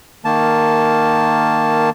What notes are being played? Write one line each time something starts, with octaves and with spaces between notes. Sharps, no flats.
D#3 A#3 A5